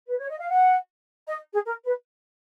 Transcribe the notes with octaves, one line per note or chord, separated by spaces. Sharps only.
B4
C#5
D#5
F5
F#5
D#5
G#4
A#4
B4